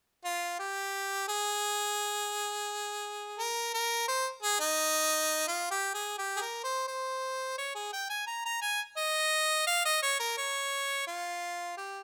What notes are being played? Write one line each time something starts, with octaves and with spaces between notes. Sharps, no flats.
F4
G4
G#4
A#4
A#4
C5
G#4
D#4
F4
G4
G#4
G4
G#4
A#4
C5
C5
C#5
G#4
G5
G#5
A#5
A#5
G#5
D#5
F5
D#5
C#5
A#4
C#5
F4
G4